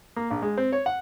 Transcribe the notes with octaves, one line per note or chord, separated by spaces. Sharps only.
A#3
A#1
G#3
C4
C#5
F#5